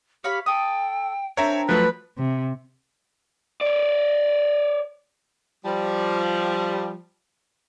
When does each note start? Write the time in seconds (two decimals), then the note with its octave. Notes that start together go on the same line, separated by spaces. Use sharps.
0.24 G4 C#5 F5 B5
0.46 A4 G5 D#6
1.37 C4 D4 A#4 C#5 E5
1.69 F3 F#3 A3 B4
2.18 C3
3.61 C#5 D5
5.65 F3 G3